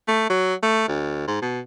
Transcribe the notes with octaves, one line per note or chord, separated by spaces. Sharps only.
A3
F#3
A3
D2
G#2
B2